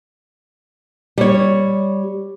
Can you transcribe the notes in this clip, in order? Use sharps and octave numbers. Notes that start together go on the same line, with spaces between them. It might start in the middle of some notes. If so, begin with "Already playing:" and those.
G3 C#5